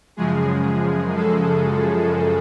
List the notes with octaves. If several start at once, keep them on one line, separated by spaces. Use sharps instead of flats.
F#2 C#3 F3 G#3 G#4
A4